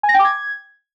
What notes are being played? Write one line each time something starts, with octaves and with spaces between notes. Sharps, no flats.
G#5
A#6
G5
D6
G#6